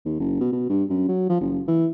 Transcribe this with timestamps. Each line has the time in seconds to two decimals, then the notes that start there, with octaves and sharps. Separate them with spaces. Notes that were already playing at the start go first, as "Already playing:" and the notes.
0.05 D#2
0.20 F#1
0.40 B2
0.52 B2
0.69 G2
0.90 F#2
1.08 F#3
1.29 F3
1.41 F#1
1.68 E3